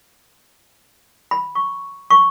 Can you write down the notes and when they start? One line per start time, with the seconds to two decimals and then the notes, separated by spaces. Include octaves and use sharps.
1.31 B5
1.55 C#6
2.10 C#6